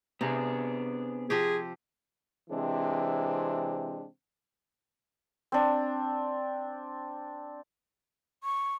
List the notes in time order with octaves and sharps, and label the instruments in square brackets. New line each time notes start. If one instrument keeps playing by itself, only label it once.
[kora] C3 [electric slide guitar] B3 D4 G#4
[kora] F3 C4 G4 [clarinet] G#4
[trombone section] C3 E3 G#3 C4 D4
[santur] C4 D4
[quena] C#6